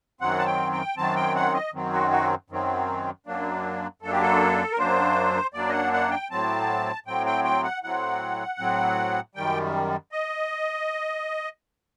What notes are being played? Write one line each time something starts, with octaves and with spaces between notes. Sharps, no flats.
F#2 D#3 F#3 C4 F#5
A5
G5
G5
F#2 D#3 F#3 C4 A5
G5
F#5
D#5
F#2 D#3 F#3 C4
F#4
F#4
F#2 D#3 F#3 C4
F#2 F#3 A#3 D4
F#2 F#3 A#3 D4 A4
G4
A4
A#4
F#2 F#3 A#3 D4 C5
F#2 F#3 A#3 D4 D5
D#5
F#5
F#5
G5
A2 F#3 C4 A5
A2 F#3 C4 G5
G5
G5
F#5
A2 F#3 C4 F#5
A2 F#3 C4
F#2 D#3 G3 G5
D#5